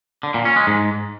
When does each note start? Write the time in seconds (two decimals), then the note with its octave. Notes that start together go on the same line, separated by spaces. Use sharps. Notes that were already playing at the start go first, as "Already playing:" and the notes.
0.23 D3
0.34 A#2
0.45 C#4
0.56 G#3
0.67 G#2